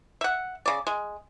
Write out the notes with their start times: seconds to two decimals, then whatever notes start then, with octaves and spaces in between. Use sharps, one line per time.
0.21 E5 F#5
0.66 C#3 D5
0.87 G#3